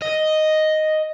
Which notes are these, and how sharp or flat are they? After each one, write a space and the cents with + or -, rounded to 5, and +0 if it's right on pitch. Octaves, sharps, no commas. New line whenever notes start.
D#5 +0